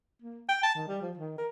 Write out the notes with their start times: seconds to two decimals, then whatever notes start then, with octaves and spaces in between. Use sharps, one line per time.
0.22 A#3
0.49 G5
0.63 A5
0.75 D#3
0.88 G3
1.02 F3
1.17 D#3
1.38 A#4